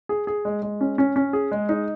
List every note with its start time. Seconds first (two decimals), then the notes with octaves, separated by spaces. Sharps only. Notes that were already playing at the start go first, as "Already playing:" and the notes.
0.09 G#4
0.27 G#4
0.45 G#3
0.62 G#3
0.81 C#4
0.98 C#4
1.16 C#4
1.33 G#4
1.52 G#3
1.69 D#4